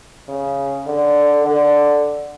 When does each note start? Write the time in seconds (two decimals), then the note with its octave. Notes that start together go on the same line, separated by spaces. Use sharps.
0.29 C#3
0.86 D3
1.43 D3